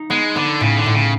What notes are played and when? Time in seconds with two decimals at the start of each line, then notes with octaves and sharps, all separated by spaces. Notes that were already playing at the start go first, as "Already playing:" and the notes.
Already playing: D#4
0.10 G#3 B3
0.35 D3 B3
0.61 A2 C#3
0.77 D3
0.86 A2
0.95 C#3